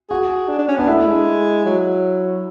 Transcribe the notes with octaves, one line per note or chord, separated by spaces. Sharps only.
F#4 G#4
D4
D4
C#4
B3 D4
A3 E4
G#3
F#3